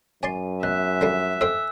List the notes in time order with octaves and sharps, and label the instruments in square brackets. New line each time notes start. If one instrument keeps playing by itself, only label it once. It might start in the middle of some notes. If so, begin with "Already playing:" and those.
[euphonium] F#2 [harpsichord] C#5 D5 C6 [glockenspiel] G#5
[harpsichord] B2 [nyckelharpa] E5 [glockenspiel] F#6
[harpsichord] D3 F3 G3
[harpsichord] F2 C4 G5 [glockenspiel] E6